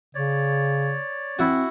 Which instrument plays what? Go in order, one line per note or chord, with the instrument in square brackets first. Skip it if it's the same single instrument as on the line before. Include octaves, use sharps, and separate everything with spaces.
[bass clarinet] C#3 [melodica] C#5 D5
[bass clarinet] C4 [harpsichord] E4 F#4